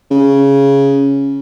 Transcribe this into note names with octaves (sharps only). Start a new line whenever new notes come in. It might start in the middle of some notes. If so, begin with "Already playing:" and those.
C#3